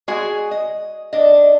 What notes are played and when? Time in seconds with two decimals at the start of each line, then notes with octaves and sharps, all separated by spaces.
0.08 G#3 F#4 G#4 G#5
0.51 D#5
1.13 D4 D#5